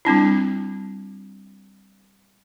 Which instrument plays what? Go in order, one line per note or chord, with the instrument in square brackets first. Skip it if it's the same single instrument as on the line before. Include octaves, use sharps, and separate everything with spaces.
[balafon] G3 C4 D4 E4